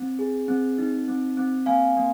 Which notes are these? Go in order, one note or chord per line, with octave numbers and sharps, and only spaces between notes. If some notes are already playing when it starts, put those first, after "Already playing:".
Already playing: C4
G#4
C4
D#4
C4
C4
A#3 F5 G#5
A#3